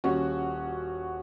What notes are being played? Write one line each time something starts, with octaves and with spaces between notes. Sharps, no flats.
D#1 C#4 F#4